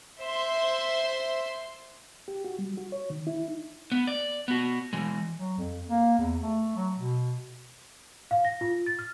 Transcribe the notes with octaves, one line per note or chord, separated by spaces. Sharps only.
C5 E5 C6
G4
F#4
G3
F#4
C#5
D#3
E4
D#4
B3
D5
B3 F#4
E3 G#3
F#3
F2
A#3
E2
A3
F#3
B2
F5
A#6
F4
A6
F6